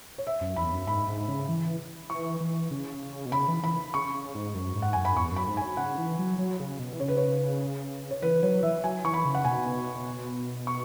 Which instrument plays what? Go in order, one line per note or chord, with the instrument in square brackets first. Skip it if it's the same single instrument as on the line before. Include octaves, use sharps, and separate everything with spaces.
[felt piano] C#5
E5
[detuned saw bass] F#2
[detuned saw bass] E2 [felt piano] B5
[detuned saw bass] F#2
[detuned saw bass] G#2 [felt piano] B5
[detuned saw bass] G#2
C#3
E3
[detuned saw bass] E3 [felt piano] C#6
[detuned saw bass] E3
C#3
B2
[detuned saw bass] C#3 [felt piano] B5
[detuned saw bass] E3
[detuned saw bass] E3 [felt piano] B5
[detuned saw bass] C#3 [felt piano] C#6
[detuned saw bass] C#3
G#2
F#2
G#2
[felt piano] F#5
[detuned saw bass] F#2 [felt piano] G#5
[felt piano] B5
[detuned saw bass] E2 [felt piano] C#6
[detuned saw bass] F#2
[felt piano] B5
[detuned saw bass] G#2
[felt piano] G#5
[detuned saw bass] F#3
[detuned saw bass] C#3 [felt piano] F#5
[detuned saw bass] E3
F#3
F#3
C#3
B2
E3
[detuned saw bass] C#3 [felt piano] C#5
[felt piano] B4
C#5
C#5
[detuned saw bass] E3 [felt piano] B4
[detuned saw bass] F#3 [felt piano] C#5
[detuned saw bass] E3 [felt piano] E5
[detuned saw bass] F#3 [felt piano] G#5
[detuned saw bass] E3 [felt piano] C#6
[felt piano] B5
[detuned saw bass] C#3
[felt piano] F#5
[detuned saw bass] B2 [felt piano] G#5
[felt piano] C#6